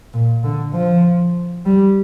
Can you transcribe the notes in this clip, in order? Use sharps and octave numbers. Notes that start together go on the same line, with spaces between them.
A#2
D3
F3
G3